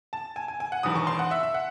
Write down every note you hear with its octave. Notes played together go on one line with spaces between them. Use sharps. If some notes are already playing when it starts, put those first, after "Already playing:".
A5
G#5
G#5
G#5
F#5
E1 E2 D#3 D#6
C#6
C6
F#5
E5
E5
F#5